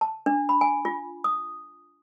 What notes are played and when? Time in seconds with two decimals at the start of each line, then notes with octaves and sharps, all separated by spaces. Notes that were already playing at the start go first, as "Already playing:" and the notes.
0.01 A5
0.26 D4
0.49 B5
0.61 G#5
0.85 F4
1.24 D#6